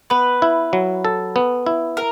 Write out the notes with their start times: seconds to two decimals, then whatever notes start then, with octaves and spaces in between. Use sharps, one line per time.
0.10 B3 B4
0.42 E4
0.73 F#3
1.05 A4
1.36 B3
1.66 E4
1.97 A#4